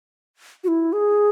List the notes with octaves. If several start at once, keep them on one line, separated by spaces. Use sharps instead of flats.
F#4
E4
G#4